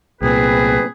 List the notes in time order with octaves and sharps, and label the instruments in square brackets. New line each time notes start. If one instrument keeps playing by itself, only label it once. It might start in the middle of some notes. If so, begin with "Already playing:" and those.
[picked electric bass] C2 A#2 [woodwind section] C4 G#4 B4